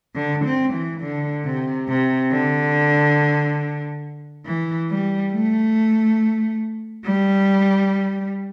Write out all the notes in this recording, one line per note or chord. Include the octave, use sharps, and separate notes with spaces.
D3
C4
E3
D3
C3
C3
D3
E3
G3
A3
G3